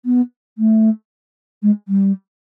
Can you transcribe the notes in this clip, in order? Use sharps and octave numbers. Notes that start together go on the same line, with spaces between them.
B3
A3
G#3
G3